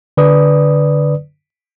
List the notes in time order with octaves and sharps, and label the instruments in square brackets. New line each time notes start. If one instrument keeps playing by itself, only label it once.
[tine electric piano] D3 B4 D5 D#6